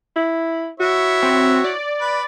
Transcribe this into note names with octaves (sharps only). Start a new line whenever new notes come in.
E4
E4 F#4 C#5
C4
D5
B4